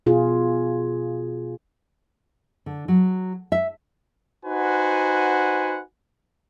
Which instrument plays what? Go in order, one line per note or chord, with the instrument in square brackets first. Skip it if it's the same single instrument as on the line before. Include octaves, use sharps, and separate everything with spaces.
[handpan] B2 F4 G#4
[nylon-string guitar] D3
F#3
E5
[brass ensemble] D#4 F#4 B4 C5 F#5 G#5